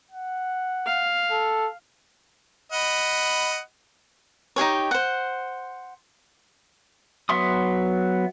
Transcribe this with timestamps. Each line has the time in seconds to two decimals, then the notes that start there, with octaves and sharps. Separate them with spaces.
0.11 F#5
0.86 F5
1.31 A4
2.72 D#5 F#5 B5
4.56 D#4 G4 G#4 C#5
4.91 C5 F#5
7.29 F#3 B3 E5 C6 D#6